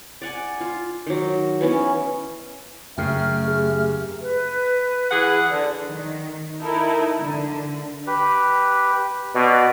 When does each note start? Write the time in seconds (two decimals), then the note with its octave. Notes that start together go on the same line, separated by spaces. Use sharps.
0.22 D5 F#5 G#5
0.60 F4
1.06 D#3 F#3
1.61 E3 B3 C#4
2.98 F#2 C#3 A3 G5 F6
3.46 G4 G#4
4.21 B4
5.10 E3 G#4 F#5
5.51 D3
5.87 D#3
6.62 D#4 E4 A4 A#4
7.22 D3
8.07 G4 B4
9.35 B2 F#4 D5